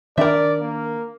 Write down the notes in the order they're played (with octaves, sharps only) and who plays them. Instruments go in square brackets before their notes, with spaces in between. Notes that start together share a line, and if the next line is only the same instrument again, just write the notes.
[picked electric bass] D#3 D4 [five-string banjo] A#4 E5 [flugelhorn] D5
[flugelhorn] A#3